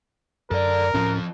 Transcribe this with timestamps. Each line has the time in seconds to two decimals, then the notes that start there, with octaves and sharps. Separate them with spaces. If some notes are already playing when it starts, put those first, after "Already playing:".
0.51 F#2 A4 A#4 D5
0.94 D1 F2 A2 F3 C#4